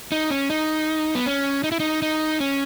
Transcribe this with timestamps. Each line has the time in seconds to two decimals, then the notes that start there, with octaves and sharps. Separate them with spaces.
0.12 D#4
0.30 C#4
0.50 D#4
1.15 B3
1.26 C#4
1.64 D#4
1.72 E4
1.80 D#4
2.02 D#4
2.40 C#4